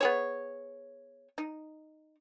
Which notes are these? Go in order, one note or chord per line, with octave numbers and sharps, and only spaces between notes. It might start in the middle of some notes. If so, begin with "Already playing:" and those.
B3 G#4 C#5
D#4